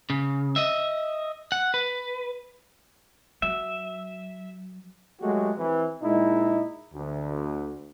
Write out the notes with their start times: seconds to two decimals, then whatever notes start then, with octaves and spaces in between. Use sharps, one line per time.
0.10 C#3
0.56 D#5 E5
1.52 F#5
1.74 B4
3.42 F#3 E5
5.22 F#3 G#3 A3 F#4 G4
5.58 C3 E3
6.02 A#2 G#3 D#4 E4
6.94 D2